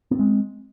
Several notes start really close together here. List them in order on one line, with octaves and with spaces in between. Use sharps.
B3 C4 G#3